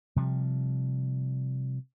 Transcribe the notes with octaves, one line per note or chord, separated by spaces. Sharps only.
C3 F3 G3